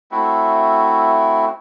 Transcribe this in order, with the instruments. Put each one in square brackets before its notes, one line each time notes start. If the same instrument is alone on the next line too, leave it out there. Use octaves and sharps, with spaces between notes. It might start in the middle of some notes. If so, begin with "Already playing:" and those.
[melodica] A3 C4 E4 F#4